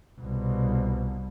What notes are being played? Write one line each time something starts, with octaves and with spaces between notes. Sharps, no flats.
C2 B2